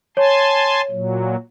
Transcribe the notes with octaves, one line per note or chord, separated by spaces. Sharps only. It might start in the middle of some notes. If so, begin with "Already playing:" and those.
C#5 G#5 A5 C6
A#2 F#3